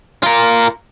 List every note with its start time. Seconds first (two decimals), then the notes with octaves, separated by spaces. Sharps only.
0.23 F4 A#4